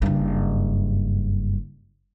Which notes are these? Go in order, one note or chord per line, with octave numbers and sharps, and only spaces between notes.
F#1 G2